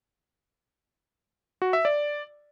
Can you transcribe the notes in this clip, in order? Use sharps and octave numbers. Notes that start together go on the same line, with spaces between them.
F#4
E5
D5